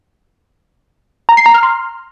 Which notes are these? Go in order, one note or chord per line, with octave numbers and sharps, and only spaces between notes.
A#5
C7
A#5
F6
C6